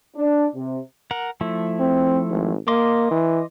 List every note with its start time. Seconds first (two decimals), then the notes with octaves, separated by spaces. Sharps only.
0.16 D4
0.55 C3
1.11 A#4 F#5
1.41 F3 A3 E4
1.80 C4
2.31 G#1
2.68 A#3 D#5 C6 D6
3.11 E3